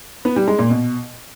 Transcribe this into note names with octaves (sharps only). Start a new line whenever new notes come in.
B3
G3
G#3
A#2
B2